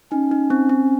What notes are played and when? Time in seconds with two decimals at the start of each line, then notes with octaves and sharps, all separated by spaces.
0.12 C#4 D#4
0.31 D#4
0.50 C4
0.69 C4